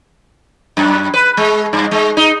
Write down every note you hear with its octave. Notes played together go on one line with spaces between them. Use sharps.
F#2
B4
G#3
G2
G#3
D#4